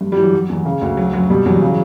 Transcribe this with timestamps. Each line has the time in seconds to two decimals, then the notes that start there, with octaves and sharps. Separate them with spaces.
0.01 G2
0.12 G3
0.17 E3
0.23 F#3
0.34 F#3
0.49 E2
0.65 C#3
0.81 D2
0.97 F#3
1.13 F#2 F#3
1.30 B2 G3
1.46 E2 F#3
1.62 C#3